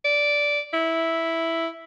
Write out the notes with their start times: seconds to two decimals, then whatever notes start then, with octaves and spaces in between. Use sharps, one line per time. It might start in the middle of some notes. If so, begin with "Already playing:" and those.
0.05 D5
0.73 E4